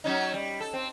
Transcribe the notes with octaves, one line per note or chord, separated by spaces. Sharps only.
F#3 C#4 D#4
G3
A4
C4